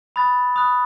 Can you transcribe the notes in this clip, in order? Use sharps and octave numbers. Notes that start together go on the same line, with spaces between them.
B5 D#6 F#6 A6
B5 D#6 F#6 A6